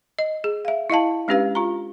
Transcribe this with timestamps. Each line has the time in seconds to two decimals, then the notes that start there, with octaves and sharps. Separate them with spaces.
0.19 D#5
0.44 G#4
0.65 E5 F5
0.90 E4 D#5 F5 A5
1.28 G#3 C#4 D4 G4 B4 F5
1.55 F4 A#5